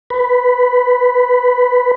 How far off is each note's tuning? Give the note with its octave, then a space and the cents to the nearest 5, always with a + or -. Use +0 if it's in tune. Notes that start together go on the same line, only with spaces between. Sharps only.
B4 +10